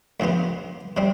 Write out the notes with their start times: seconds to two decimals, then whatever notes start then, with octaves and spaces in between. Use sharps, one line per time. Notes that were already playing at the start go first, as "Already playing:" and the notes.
0.20 D2 C3 F3 B3 F4
0.97 C3 G3 C4